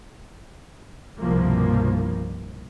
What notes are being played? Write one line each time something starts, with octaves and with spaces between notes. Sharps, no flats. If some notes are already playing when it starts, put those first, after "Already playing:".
C2 G2 B2 F3 A#3